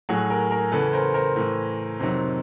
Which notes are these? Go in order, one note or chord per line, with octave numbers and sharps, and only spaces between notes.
A2 F#3 F#4 G#4
G#4 A#4
G#4 A#4
E2 C#3 E3 A4 B4
A#4 C5
A#4 C5
A2 E3
F2 C3 D#3 F#3